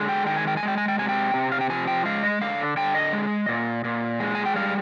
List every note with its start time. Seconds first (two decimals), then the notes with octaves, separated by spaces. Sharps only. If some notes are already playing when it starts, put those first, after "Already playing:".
Already playing: D3 G#3
0.09 G5
0.26 D#3 G5
0.37 G#5
0.47 G5
0.57 G#5
0.63 G#3
0.68 G5
0.78 G#5
0.88 G5
0.98 C3 G#5
1.09 G5
1.34 C3
1.52 F5
1.61 G5
1.70 F3 G#5
1.88 G5
2.05 G#3 F5
2.23 D#5
2.41 D3 F5
2.77 D3 G5
2.95 D#5
3.13 G#3
3.49 A#2
3.84 A#2
4.20 G#3
4.35 G#5
4.46 G5
4.56 G3 F5